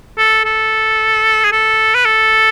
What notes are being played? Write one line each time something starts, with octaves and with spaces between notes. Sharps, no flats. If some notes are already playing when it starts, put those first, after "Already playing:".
A4
A4
G#4
A4
B4
A4